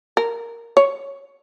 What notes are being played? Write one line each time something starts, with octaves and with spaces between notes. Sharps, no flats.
A#4
C#5